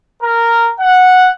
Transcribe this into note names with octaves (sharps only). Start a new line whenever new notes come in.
A#4
F#5